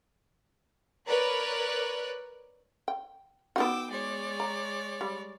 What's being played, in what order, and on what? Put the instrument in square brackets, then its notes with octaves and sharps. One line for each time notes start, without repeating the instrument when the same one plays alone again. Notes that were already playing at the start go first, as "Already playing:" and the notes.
[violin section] A#4 B4 C#5 D5 F#6
[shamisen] G5
[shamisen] B3 D#4 F#4 [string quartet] G5 D6 E6
[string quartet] G#3 C#5 D5
[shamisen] A#5
G3